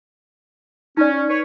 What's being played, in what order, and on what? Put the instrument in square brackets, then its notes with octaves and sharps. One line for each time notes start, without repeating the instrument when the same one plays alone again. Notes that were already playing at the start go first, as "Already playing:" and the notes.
[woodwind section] C#4 [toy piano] D#4 D5
[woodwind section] B4 C#5